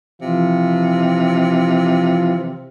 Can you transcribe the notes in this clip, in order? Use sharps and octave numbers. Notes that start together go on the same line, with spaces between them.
C3 E3 F3 F4